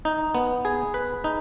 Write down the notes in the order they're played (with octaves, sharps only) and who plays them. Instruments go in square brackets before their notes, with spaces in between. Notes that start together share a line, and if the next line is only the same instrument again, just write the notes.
[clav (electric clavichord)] D#4
B3
G#4
B4
D#4